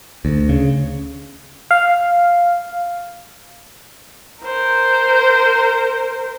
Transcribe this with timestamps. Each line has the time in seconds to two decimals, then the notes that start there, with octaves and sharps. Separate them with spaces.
0.25 D2
0.49 C#3
1.71 F5
4.43 A#4 C5